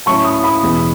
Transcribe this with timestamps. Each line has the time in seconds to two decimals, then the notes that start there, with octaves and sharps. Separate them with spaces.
0.06 A2 F#3 C#4 E4 A5 C#6
0.25 B5 D#6
0.44 B5 D#6
0.62 E2 B2 G#3